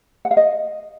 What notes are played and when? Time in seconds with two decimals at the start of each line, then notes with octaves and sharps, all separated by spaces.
0.25 F#5
0.31 F5
0.37 D#5